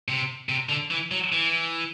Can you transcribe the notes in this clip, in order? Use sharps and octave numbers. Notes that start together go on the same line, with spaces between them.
C3
C3
D3
E3
F#3
E3